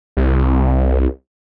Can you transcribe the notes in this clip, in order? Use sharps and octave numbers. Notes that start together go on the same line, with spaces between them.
C2